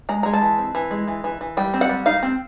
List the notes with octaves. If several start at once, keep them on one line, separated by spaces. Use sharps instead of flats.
G#3 A#5
G#3 A#5
A5
E3
C4
E3
G#3
E3
E3
E3
G3 G5
C4
F#5
G3
D#4 F5
C4